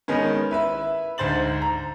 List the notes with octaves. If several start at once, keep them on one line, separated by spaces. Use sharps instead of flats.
D#3 G#3 B3 C#4
E4 B4 E5
D2 G#2 C5 A6 F#7
A#5